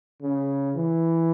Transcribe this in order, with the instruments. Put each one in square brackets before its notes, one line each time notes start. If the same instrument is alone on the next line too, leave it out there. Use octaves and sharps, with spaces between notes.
[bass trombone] C#3
E3